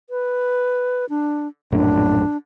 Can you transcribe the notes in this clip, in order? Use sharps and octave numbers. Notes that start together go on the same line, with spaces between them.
B4
D4
A#1 F#2 A2 D4